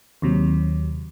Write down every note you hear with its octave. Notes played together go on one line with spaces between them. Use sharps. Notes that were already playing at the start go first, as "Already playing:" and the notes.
D#2 C3 F#3